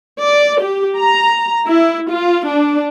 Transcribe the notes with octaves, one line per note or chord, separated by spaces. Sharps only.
D5
G4
A#5
E4
F4
D4